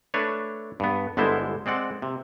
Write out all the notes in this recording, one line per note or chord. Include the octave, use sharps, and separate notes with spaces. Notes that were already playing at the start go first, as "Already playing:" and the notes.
A3 D4 B4 C#5
G2 B3
G1 D3 G#3 B3 E4 C5
G#3 C4 D5 F#5
C3